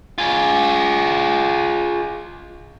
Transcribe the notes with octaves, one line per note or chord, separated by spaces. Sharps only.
F4 G#4